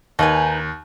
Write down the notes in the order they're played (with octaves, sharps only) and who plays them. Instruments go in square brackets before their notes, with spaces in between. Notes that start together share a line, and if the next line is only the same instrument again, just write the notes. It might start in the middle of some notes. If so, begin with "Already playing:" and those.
[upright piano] D#2 [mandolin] D#4 B4 G#5